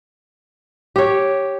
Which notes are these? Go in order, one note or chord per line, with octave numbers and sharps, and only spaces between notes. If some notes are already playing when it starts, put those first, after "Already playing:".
G4 C#5